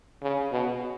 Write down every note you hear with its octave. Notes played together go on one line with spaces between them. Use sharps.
C#3
B2